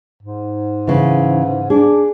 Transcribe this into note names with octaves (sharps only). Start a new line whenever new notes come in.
G#2
C#3 E3
D4 G#4